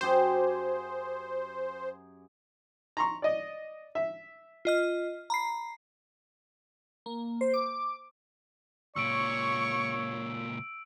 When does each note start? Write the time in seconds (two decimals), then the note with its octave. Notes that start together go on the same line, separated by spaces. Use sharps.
0.01 F#2 G4 G#4 C5
2.97 A#5 C6 C#6
3.22 D5 D#5
3.95 E5
4.65 F4 D#5 F6
5.30 A#5 B5 C7
7.06 A#3
7.41 C5
7.54 D6
8.96 C#2 A#2 C#5 C#6 E6 D7